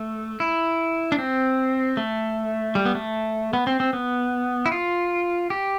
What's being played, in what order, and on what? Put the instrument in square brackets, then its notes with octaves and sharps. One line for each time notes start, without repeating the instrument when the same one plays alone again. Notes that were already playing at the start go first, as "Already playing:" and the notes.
Already playing: [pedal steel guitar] A3
E4
D4
C4
A3
G3
B3
A3
B3
C4
C4
B3
E4
F4
G4